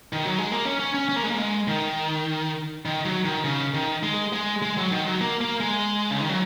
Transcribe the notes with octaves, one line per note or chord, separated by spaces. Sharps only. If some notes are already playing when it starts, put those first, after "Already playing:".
D#3
F#3
G#3
A#3
C#4
C#4
C#4
C#4
A#3
G#3
A#3
G#3
D#3
D#3
F#3
D#3
C#3
D#3
G#3
G#3
G#3
F#3
D#3
F#3
A#3
A#3
G#3
C#3
D#3
F#3